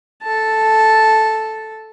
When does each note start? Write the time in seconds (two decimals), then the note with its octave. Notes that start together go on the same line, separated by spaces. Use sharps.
0.22 A4 A5